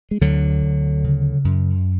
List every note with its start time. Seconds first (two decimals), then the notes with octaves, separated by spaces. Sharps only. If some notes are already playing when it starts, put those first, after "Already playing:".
0.11 G#3
0.21 D2 D3 F#3
0.63 D2
1.04 C#3
1.45 F#2